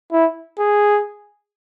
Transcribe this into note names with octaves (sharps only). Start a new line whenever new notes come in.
E4
G#4